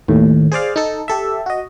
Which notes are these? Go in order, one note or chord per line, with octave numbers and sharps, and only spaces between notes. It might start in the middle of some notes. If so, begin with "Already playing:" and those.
D#2 A2
G#4 C5 D5 F5
D#4 A4
G4 A4 E5
F#4 D#5